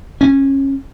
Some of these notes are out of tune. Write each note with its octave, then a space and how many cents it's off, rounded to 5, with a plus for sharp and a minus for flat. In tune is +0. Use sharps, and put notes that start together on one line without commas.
C#4 -20